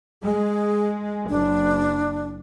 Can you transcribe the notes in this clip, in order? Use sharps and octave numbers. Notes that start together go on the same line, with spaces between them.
G#3 G#4
F#1 D4